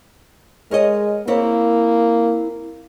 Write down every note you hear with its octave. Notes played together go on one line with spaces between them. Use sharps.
G#3 A#4 C#5 D#5
A#3 C4 E4 C#5